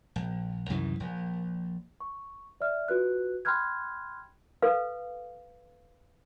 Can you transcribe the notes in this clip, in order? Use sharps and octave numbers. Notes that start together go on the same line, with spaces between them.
A#1
C2 F#2 D#3 E3
A#1
C#6
D5 E5 F6
F4 F#4 B4 F#6
G5 B5 C6 F6 F#6 G#6
A4 B4 F5